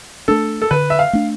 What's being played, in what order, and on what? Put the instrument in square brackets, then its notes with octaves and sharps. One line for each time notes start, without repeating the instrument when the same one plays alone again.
[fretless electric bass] A3 D4 [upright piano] A4
[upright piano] A4
[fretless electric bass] D3 [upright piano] B4
[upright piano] E5
F5
[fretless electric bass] A3 D4